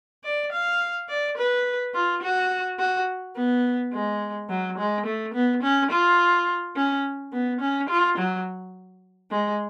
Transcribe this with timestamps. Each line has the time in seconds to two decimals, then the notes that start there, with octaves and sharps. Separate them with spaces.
0.24 D5
0.52 F5
1.09 D5
1.37 B4
1.94 F4
2.22 F#4
2.79 F#4
3.36 B3
3.92 G#3
4.49 F#3
4.78 G#3
5.06 A3
5.34 B3
5.63 C#4
5.91 F4
6.76 C#4
7.33 B3
7.61 C#4
7.89 F4
8.18 F#3
9.31 G#3